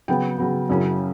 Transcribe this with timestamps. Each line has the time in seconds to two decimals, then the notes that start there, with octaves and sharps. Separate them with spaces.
0.08 C#3 F#3 B3 G5
0.38 C#3 F#3 B3
0.69 F#2 C#3 F#3 C#4 E4